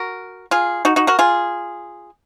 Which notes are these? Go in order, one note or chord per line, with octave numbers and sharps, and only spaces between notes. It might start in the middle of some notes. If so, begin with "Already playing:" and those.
Already playing: F#4 A#4
F4 G#4
D#4 F#4
D#4 F#4
F#4 A#4
F4 G#4